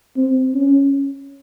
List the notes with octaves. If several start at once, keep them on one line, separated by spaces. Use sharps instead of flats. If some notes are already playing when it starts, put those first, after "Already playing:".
C4
C#4